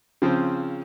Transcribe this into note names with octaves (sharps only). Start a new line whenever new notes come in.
C#3 F3 C4